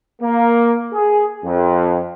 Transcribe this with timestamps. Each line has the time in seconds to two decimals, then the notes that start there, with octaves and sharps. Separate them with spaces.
0.22 A#3
0.93 G#4
1.44 F2